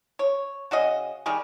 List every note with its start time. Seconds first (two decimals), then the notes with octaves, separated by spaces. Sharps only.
0.19 C#5
0.71 C#3 F#4 G#4 D#5
1.26 D#3 G3 G#4 C#6